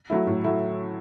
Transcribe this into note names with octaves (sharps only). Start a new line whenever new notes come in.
F#3 A3 E4
A2
F#3 A3 E4